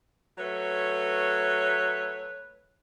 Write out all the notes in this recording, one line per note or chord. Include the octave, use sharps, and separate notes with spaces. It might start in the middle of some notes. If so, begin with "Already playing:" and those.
F#3 A3 B4 C#5